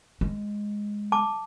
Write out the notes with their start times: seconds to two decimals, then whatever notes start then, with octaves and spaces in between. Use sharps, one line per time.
0.21 G#3
1.12 A5 D6